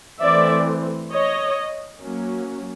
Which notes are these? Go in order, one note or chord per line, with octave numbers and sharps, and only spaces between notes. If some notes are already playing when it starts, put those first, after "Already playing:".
E3 A3 C4 D5 E5
C#5 D#5
F#3 A#3 C#4